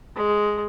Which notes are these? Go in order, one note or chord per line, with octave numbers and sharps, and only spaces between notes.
G#3